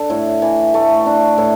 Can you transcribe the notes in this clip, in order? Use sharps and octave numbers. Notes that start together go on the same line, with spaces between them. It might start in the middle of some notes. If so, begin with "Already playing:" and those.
Already playing: D4 A4
A2
E3
A3
D4
A2